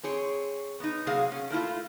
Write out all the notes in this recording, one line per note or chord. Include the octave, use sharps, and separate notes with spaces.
C4 G#4 C#5
B3 D#4
C3 F#3 A#3 G#4 F5
C#4
A3 A#3 E4 F4